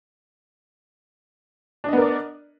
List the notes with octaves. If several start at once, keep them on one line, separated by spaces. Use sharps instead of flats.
B3 D4 A#4 D5 D#5